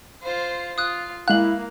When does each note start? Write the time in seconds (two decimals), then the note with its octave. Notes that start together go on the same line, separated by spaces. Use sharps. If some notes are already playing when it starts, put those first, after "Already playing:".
0.23 F4 C5
0.78 F4 D#6 F#6
1.28 G#3 A#3 E4 F5 F#6 F#7